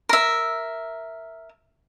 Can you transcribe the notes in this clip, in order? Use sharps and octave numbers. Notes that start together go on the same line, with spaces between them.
A#4 E5